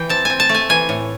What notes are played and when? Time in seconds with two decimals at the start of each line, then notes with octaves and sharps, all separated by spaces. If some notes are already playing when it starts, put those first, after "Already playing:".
Already playing: E3 G5
0.09 C4 A5
0.25 C4 G#5
0.40 A5
0.49 A3
0.54 G#5
0.69 E3 G#5
0.89 A2